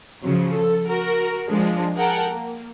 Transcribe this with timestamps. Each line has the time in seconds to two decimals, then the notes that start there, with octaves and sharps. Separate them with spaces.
0.23 C#3 F3 F#3
0.53 A4
0.88 F#4 A#4
1.48 F3 G#3 D4
1.96 G#4 A#4 F#5 G5 A5
2.29 A#3